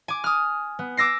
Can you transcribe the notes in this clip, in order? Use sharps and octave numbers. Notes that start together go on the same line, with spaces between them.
G#5 D6
D#6 F6
B3
D6 E6 A#6 C7